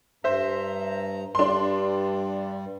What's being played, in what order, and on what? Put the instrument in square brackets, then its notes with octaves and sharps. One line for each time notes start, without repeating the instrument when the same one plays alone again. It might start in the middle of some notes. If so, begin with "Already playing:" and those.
[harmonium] G2 A#5 [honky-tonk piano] C5 E5
[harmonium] G2 G3 [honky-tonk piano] D4 C6